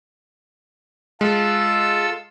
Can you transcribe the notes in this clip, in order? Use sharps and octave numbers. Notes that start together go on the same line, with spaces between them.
G#3 F4 A4 E6